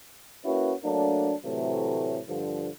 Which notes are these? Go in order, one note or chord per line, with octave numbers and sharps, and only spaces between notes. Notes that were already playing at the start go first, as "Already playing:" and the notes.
A#3 C#4 E4 F#4 B4
F#3 A3 A#3 D4
A2 C3 E3 F#3 A3
G2 D3 F3